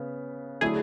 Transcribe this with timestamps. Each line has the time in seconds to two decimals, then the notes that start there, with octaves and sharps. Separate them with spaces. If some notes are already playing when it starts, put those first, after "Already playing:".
Already playing: C#3 B3
0.61 D3 F#3 A3 E4 G#4